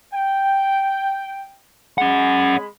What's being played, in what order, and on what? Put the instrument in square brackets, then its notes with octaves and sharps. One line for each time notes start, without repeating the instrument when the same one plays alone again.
[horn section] G5
[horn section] G#3 G#4 B5 [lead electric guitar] C#4 F#5